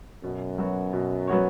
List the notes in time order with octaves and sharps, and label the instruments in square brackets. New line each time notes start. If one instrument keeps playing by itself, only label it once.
[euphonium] F#2 [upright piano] B2
[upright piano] F#3 B3 F#4 C#5
B2
F#3 B3 F#4 C#5